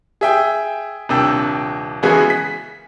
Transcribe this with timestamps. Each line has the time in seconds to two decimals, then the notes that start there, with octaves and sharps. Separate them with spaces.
0.21 G#4 E5 G5
1.09 D#1 C3 D4 G5 E6
2.03 C#3 E3 G#3 B3 F#4 G#4
2.30 B6